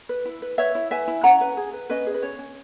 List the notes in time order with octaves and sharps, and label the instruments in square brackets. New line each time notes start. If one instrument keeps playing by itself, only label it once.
[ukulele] B4
E4
B4
B4 C#5 E5
E4
B4 E5 G#5
E4
C#4 F#5 A#5
B4
G#4
B4
C#4 B4 D#5
G#4
B4
C#4 C#5
C#4